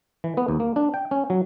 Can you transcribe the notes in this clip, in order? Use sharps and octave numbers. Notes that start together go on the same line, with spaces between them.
E3
B3
D#2
A#3
D4
G5
C#4
F#3